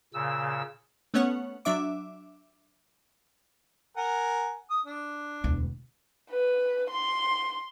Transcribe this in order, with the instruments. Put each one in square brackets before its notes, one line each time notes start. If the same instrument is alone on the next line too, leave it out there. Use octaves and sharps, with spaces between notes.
[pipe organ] A#2 C#3 E6
[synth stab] A3 B3 C#4 C#5 F#5
F#3 D4 E5 D6
[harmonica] A#4 F#5 G#5
D#6
D4
[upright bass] E1 D2
[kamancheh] B4
C6